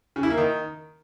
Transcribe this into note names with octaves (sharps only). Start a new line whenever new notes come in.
C#3
E4
A#3
D#3